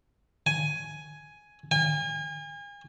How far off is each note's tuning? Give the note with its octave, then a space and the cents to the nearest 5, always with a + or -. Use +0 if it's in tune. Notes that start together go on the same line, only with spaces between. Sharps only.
G#5 +5
G#5 -40